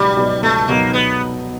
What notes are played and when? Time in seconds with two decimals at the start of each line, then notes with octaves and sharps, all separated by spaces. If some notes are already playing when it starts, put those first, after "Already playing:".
Already playing: C#2 B2 F#3 G3 B3 D#4
0.17 B2 F#3 B3 D#4
0.43 C#2 A3
0.68 B2 F#3 A#3 B3 D#4
0.93 B3